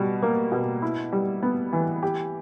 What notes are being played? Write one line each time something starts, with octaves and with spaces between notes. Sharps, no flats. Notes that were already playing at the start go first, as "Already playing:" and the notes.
Already playing: B2 G3
A#3
B2
E4
G3
B3
E3
G4